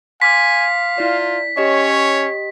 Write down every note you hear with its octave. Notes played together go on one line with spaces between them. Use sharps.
F5 G#5 C6 D6 F6 B6
E4 F4 D5
C#4 G4 C#5 D#5